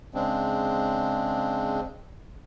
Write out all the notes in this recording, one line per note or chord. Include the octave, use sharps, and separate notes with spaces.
C#3 G#3 C4 D4